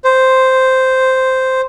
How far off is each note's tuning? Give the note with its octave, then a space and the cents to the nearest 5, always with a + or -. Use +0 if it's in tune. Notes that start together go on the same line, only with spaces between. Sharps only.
C5 -5